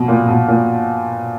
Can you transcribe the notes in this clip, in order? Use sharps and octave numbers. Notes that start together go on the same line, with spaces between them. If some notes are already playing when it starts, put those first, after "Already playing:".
Already playing: B2 F3
A#2
B2
A#2